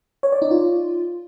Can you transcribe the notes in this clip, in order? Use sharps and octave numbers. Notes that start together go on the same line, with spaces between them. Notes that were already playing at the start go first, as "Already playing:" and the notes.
C#5
D5
D#4
F4